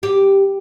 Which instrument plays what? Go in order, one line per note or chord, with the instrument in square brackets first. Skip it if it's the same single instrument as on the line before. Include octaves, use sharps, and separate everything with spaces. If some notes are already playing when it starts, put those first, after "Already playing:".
[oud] G4